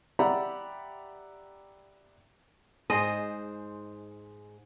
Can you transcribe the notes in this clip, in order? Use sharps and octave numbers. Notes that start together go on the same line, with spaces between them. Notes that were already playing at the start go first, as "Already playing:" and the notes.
G4 D5 E5 F#5 A#5 B5
G#2 G#4 C5 D#5 C6